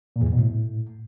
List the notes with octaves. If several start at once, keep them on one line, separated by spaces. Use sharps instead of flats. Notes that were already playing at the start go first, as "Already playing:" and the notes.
A#2
E2
G#2
B2
A2